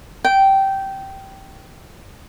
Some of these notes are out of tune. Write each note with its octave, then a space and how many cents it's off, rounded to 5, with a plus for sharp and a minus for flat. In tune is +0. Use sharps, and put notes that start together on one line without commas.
G5 -15